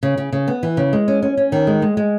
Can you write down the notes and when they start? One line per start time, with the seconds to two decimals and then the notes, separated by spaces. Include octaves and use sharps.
0.03 C#3
0.17 C#3
0.32 C#3
0.48 B3
0.63 E3
0.77 C#3
0.93 G#3
1.08 C#4
1.22 C#4
1.37 C#4
1.52 D#3
1.67 G#3
1.82 G#3
1.97 G#3